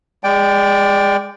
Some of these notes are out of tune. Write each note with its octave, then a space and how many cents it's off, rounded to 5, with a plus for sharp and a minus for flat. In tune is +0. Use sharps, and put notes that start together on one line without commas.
G#3 -25 D5 +0 G5 +0